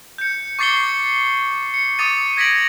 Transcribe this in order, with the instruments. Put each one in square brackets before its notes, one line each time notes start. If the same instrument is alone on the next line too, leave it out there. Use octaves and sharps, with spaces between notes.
[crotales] G6 C#7
C#6 D6 A6 C7 C#7 G7
C#7
D6 D#6 A6 D#7
G#6 A#6 B6 D7 F#7